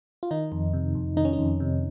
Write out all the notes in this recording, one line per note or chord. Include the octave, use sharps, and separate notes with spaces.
F4
D#3 D#4
F2
C3
F2
D#3 D#4
C#4
D#4
F2
C3